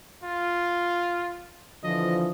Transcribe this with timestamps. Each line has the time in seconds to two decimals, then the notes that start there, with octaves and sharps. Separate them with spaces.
0.24 F4
1.84 D3 E3 F3 D#5